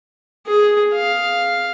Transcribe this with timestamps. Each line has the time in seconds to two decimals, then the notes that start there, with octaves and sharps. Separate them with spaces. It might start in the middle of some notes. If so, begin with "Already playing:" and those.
0.47 G#4
0.95 F5